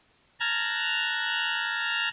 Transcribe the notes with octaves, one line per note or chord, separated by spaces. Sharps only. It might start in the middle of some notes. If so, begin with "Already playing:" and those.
A5 A#5 F6 F#6 G#6